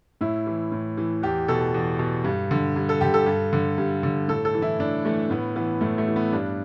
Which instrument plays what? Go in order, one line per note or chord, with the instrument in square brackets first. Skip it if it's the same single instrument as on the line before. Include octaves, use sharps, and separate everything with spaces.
[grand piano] A2 E4
E3
A2
E3
E2 G4
B2 A4
E2
B2
G2
D3
G2
A4
D3 G4
A4
G2
D3
G2
D3
A2 A4
A4
E3
E4
A2 D4
E3 A3
A2 B3
E3 B3
A2 A3
A3
E3
B3
G2 D4